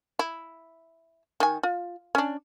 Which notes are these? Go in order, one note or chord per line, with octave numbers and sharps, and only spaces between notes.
E4
D#3 G#5
F4
C#4 D4